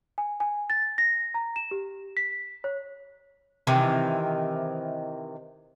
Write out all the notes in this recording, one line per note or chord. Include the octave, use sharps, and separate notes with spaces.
G#5
G#5
A6
A#6
A#5
E7
G4
B6
C#5
C3 D#3 E3